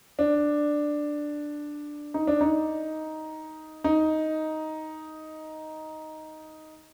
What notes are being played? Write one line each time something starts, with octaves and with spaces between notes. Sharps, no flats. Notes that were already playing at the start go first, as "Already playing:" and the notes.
D4
D#4
D4
D#4
D#4